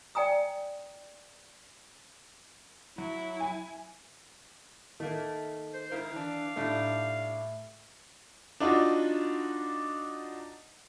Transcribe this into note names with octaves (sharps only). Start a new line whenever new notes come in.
D5 G5 G#5 A#5 D#6
F#3 E4
G#5
D#3 A3 A#3
C5
G#2 E4 A#4 F5
E3 D4
A2 G3 D4 D#4
D4 D#4 F4 F#4